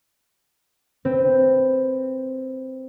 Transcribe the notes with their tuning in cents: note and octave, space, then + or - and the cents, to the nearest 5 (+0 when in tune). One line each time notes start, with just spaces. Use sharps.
C4 +0 B4 +10